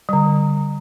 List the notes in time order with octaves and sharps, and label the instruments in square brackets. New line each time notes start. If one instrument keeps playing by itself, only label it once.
[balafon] D3 G3